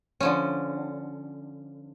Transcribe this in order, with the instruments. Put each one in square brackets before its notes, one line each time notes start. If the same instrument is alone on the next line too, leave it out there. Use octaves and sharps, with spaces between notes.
[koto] D3 F3 C#4